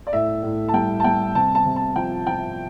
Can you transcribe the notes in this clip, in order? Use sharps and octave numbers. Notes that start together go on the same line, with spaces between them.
D5
A2 E5
A2
A5
G3 G5
A5
G3 G5
C3 A5
A5
C3
A5
F3 G5
F3 G5